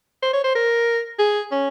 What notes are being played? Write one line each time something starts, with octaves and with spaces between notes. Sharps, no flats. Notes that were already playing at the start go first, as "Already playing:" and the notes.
C5
C#5
C5
A#4
G#4
C#4